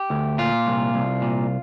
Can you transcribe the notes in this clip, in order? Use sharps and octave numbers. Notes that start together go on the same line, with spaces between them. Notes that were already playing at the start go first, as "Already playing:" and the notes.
Already playing: G4
D2
A#2 F4
C2
C2
A#2